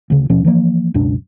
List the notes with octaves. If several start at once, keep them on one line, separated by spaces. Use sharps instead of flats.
D2 C#3
D#2 B2 F3 C#4
E3 F3 A#3
C#2 F#2 B2 D4